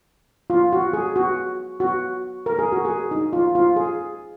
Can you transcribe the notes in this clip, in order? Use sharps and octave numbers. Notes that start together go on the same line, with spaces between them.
F4
F#4
G#4
F#4
F#4
A#4
G#4
F#4
G#4
D#4
F4
F4
G#4